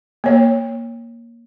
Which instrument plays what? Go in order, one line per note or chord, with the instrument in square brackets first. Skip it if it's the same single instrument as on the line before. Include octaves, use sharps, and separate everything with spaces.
[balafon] A#3 C#5